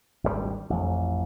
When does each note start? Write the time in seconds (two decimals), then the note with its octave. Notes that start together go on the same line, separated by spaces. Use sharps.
0.24 G#1 D2 B2 G3
0.70 A1 F2